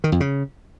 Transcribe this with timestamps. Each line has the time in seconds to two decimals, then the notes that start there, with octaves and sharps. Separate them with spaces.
0.04 D#3
0.12 F2
0.20 C#3